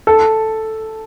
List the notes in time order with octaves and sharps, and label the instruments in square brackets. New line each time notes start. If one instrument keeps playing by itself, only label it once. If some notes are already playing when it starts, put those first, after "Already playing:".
[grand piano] A4